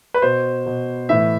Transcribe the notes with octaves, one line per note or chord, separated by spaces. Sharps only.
B4
B2 C5
B2
A2 E3 E5